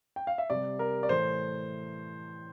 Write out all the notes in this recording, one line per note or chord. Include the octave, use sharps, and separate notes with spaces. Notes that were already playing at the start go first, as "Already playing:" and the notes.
G5
F5
E5
C3 G3 D5
A#4
D5
A2 E3 A3 C5